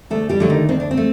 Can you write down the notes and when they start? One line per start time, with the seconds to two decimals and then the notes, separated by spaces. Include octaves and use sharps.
0.10 D2 A3 A4
0.29 G3 G4
0.40 D3 F#3 A3
0.49 D#3 D#4
0.69 D2 C4
0.80 D4
0.91 C4
0.97 A3